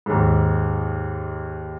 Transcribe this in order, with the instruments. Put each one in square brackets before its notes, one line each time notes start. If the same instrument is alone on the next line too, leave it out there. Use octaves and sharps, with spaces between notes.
[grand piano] D#2 G#2